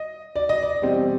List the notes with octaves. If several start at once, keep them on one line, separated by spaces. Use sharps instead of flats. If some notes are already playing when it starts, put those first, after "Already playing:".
Already playing: D#5
D5
D#5
D5
E2 B2 G3 C4